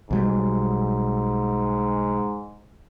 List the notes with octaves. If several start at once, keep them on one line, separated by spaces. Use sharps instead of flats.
B1 G#2 F#3 G3